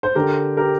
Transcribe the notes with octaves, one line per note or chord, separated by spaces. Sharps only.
C5
D3 G4 A#4
G4 A#4